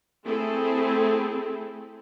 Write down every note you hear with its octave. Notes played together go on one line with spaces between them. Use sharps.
A3 C4 E4 G#4 A4